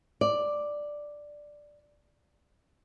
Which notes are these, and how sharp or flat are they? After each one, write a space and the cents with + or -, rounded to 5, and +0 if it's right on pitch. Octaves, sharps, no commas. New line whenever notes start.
D5 +5